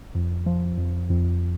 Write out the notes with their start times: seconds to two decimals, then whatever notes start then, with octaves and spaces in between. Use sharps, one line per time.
0.15 F2
0.46 F3
0.78 F2
1.10 F2